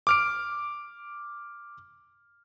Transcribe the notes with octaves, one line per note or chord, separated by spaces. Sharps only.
D6 F6 D7